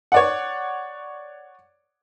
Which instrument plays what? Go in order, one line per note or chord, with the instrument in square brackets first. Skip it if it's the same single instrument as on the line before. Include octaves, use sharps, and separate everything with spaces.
[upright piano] C#5 D5 F#5